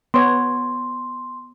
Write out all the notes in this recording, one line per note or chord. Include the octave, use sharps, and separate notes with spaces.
B3 C#5 C6